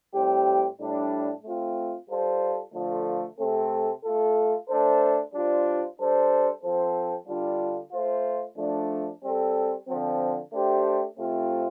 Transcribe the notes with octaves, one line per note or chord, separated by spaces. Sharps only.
A2 G3 C4 G4
A2 G3 D4
A3 C4 F4
G3 F4 A4 C5
D3 F3 A3 F4
C3 A3 C4 A4
A3 F4 A4
A3 D4 A4 C5
G3 D4 F4 C5
G3 D4 A4 C5
F3 C4 A4 C5
D3 G3 D4 F4
A3 F4 C5
F3 A3 D4
G3 C4 A4
D3 F3 C4
A3 D4 G4 C5
C3 A3 C4 F4